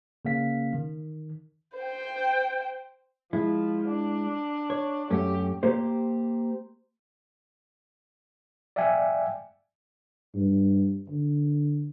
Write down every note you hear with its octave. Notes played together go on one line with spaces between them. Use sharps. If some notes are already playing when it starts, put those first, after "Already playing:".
C#3 A#3 C#4 F5 B6
D#3
C5 G5
F3 G#3 E4
D4
C#5
F#2 A3 C#4 G4
A#3 G4 C5
D5 E5 F5 G5 G#5
G2
D3